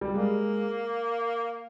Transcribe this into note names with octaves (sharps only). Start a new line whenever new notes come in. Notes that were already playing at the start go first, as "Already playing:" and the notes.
G3
G#3 A#3